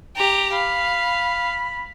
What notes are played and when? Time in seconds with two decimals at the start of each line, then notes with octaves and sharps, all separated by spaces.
0.16 G4 A#5
0.53 F5 B5